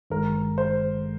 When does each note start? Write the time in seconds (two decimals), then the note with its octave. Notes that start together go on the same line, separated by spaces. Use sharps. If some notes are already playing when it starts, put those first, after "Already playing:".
0.10 G#1 G2 D#3 G#3 A#4
0.58 C5